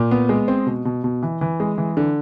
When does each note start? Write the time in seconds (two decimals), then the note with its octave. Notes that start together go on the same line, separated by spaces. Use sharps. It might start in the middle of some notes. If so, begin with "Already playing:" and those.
Already playing: A#2
0.11 B3
0.29 G#3
0.48 C4
0.66 B2
0.85 B2
1.04 B2
1.23 E3
1.41 E3
1.60 G#3
1.78 E3
1.97 D3